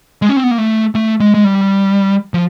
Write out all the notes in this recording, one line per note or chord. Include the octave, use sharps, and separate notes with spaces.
G#3
C#4
C4
B3
A#3
A3
A3
G#3
G#3
G3
F3